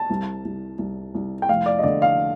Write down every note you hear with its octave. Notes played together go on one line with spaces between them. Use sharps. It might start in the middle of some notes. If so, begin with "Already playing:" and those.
Already playing: A5
C2
C2
C2
C2
G5
F1 F5
D5
D#5
D3 D5
F5